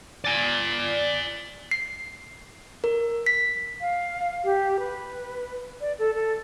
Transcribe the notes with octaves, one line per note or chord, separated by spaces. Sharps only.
D5 G#5
C7
A#4
B6
F5
G4
B4
D5
A4
A4